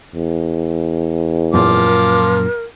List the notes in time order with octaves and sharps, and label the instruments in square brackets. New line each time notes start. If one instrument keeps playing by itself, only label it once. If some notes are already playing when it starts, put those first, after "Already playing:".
[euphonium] E2
[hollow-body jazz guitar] F#2 A#2 [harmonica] F3 D6 [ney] A#4